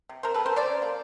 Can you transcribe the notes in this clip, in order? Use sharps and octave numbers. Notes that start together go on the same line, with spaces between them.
C3
C3 A#4 C5
C3 A4 B4
A#4 C5
A3
C5 D5
C#4
A#3